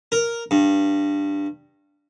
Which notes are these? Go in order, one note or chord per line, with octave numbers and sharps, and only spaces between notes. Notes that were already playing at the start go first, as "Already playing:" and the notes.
A#4
G2